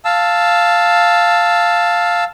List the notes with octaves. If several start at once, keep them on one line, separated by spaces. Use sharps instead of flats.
F5 A5 E6